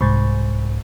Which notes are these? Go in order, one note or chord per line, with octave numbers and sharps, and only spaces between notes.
C2 G#2